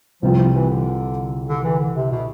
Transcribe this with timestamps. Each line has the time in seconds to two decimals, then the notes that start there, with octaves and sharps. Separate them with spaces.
0.22 C2 C3 F3 G3 C4 F4
0.38 F3
0.54 E3
0.69 D3
1.49 D3
1.64 E3
1.79 D3
1.96 C3
2.11 B2